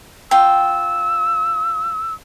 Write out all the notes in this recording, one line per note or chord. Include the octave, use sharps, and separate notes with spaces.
F4 G5 E6